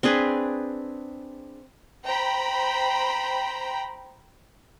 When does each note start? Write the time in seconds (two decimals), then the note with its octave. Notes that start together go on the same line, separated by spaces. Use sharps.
0.03 C4 D4 G#4 B4
2.04 C5 G5 A#5 B5